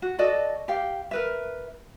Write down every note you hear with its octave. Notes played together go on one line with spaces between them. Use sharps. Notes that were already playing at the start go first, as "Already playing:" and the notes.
F#4
F#4 A4 D5 D#5
G4 F5 G5
A#4 B4 E5